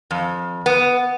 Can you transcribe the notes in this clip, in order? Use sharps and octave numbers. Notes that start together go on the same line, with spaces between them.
F2
B3